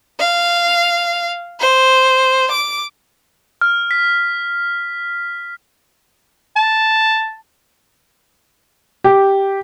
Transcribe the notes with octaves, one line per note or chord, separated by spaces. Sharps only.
F5
C5
D6
F6
B6
A5
G4